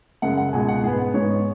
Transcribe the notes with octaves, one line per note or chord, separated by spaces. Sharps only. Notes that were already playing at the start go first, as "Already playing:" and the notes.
F#2 C#3 G#3 F#5
F#5
C#2 B2 G#3 G#5
F#5
G#2 G#3 B3 G#4
G#2 G#3 B3 C#5